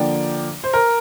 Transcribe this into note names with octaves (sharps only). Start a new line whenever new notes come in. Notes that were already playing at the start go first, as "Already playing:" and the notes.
Already playing: D3 F3 A#3 D5 G5
C5
A#4